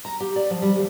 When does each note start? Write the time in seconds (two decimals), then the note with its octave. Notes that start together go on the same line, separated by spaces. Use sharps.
0.05 A#5
0.20 G4
0.36 D5
0.50 F3
0.62 G3
0.76 D#2